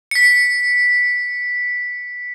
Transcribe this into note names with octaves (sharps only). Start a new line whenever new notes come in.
B6 C#7